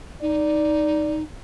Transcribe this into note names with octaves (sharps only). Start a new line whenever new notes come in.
D#4 D5